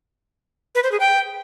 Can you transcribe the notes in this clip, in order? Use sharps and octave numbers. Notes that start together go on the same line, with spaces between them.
B4
C5
G#4
G5